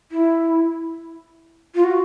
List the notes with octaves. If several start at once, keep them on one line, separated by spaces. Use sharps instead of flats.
E4
F4
F#4